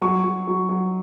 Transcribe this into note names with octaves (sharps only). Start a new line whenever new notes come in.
F#3 C#6
F#3
F#3
F#3